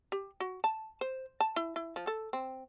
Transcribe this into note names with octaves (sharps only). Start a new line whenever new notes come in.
G4
F#4
A5
C5
A5
E4
E4
F3
A4
C4